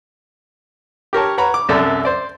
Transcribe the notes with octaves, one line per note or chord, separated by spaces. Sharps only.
G4 A#4 C#5 A5
B4 C#5 F#5 A#5 B5
D6
C2 F#2 A4 D5
C5 D5